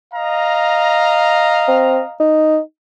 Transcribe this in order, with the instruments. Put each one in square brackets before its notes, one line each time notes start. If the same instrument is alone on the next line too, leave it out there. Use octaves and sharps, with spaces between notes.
[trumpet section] D#5 F5 A#5
[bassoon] C4
D#4